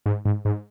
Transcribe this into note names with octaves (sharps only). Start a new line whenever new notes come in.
G#2
G#2
G#2